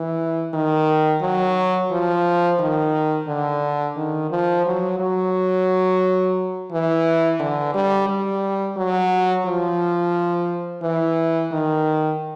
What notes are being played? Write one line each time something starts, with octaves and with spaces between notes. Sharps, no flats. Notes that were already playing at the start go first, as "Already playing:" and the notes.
Already playing: E3
D#3
F#3
F3
D#3
D3
D#3
F3
F#3
F#3
E3
D3
G3
G3
F#3
F3
E3
D#3